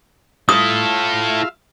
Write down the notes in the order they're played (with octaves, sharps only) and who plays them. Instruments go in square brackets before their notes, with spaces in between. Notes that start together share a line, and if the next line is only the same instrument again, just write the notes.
[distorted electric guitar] E4 A4 [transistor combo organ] F4 E5 F5 [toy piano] D#6